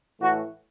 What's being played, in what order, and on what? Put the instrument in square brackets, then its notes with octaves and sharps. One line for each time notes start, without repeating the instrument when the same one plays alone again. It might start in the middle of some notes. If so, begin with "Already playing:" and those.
[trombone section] A2 E3 A3 F#4